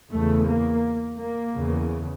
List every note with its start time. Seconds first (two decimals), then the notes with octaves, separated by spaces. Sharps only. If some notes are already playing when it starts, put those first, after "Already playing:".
0.12 E2 C#3 A3
0.48 A#3
1.19 A#3
1.54 E2 C#3